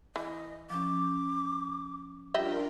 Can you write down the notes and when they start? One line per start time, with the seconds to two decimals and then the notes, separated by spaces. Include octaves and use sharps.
0.16 E3 D#5
0.70 F3 C#4 D6
2.34 G3 D4 F4 A#4 D#5 E5